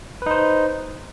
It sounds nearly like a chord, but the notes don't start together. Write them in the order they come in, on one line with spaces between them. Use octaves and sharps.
B4 D#4 C5